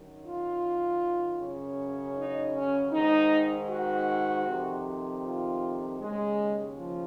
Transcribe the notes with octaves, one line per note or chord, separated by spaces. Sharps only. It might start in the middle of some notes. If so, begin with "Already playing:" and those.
Already playing: F#2 D#3
F4
F#2 C#3
D#4
C#4
G#2 D#3 D#4
F#4
F2 C3 D#3
F4
D#2 C#3 G#3
F3